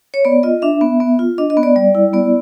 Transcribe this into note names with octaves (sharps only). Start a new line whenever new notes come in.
C#5
B3 D5
F4 D#5
D4 E5
B3
B3
F4
D4 D#5
D#5
B3
D5
G3 D5
E4
B3 D5